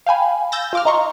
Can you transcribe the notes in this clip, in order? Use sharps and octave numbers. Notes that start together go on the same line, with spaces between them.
F5 G5 G#5 B5
E6 G6 A6 A#6
F4 D6 F6
D#4 D#5 A#5 C6 C#6